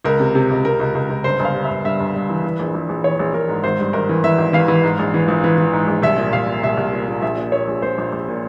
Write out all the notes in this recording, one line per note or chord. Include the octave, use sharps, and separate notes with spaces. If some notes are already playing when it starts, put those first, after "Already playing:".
C#2 A#4
C3
C3
C#2
C3 A#4
C#2
C#2
C#2
G1 C5
G1
F5
G2
E5
G1
G2 E5
G1
G2
E3
E3
A#1
A#1
A#1
E3 C#5
A#1
A#1 A#4
G#2
G#1 C5
G2
G#1 A#4
E3
E3 E5
G#1
E3 F5
E3
G#2
A#1
E3
A#1
E3
E3
G#2
A#1
C2 E5
A#2
C2 F5
A#2
C2 E5
C2
A#2
A#2
A#1 E5
A#2
A#2 C#5
A#1
A#1 C5
A#1
A#1
A#2